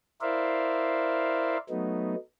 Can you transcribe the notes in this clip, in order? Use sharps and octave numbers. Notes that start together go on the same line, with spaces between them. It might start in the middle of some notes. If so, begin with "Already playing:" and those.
E4 A#4 C5 D5 E5 F5
F#3 A3 B3 D#4